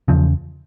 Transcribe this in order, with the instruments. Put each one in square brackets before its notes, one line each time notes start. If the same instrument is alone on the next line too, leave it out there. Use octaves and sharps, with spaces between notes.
[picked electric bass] E2 C#3 F3